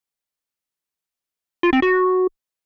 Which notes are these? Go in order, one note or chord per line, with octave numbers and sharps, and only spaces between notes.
F4
C4
F#4